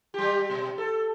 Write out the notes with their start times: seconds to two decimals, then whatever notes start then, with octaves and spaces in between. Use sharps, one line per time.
0.14 G3 G4
0.50 B2
0.78 A4